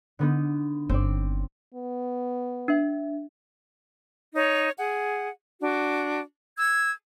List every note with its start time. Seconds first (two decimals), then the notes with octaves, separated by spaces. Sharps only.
0.19 D3 B3 D#4
0.89 G1 C4 D5
1.74 B3
2.68 D4 E5
4.33 D#4 C#5
4.77 G#4 F#5
5.61 D4 F#4
6.57 E6 G#6